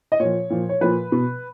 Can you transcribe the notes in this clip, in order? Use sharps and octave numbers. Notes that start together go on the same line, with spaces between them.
D#5
A#2 F3 C#5
A#2 F3
C#5
A#2 F3 B4
B2